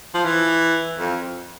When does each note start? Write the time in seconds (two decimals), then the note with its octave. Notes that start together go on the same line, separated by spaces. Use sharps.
0.14 F3
0.25 E3
0.99 F2